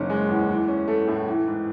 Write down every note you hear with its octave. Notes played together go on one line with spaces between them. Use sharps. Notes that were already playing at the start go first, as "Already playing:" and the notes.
Already playing: F#1 D#3 C#4
G#3
E2
E3
C#4
A3
A2
E3
G#2